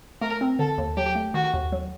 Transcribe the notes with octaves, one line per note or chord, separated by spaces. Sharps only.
A3 A#4
C4
D3 A4
D#2
F#3 G4
A3
D#3 F#4
D#2
F#3